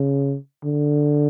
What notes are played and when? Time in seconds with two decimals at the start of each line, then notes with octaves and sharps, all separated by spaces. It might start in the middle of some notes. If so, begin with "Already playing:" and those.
Already playing: C#3
0.64 D3